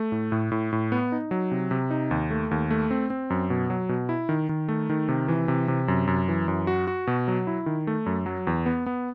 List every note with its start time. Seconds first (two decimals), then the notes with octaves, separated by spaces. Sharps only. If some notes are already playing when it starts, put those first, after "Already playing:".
Already playing: A3
0.12 A2
0.32 A2
0.52 A2
0.73 A2
0.92 B3
1.12 D#4
1.31 F#3
1.51 C3
1.71 C3
1.91 D#4
2.11 D#2
2.31 A3
2.51 D#2
2.71 A3
2.91 C4
3.10 C4
3.30 F#2
3.50 B2
3.70 F#3
3.89 B2
4.09 E4
4.29 D#3
4.49 D#3
4.68 A3
4.89 D#3
5.08 C3
5.28 E3
5.48 C3
5.68 C3
5.88 F#2
6.07 F#2
6.28 E3
6.48 F#2
6.67 F#4
6.87 F#4
7.07 B2
7.28 F#3
7.47 E4
7.66 D#3
7.87 A3
8.06 F#2
8.26 F#3
8.47 E2
8.66 B3
8.86 B3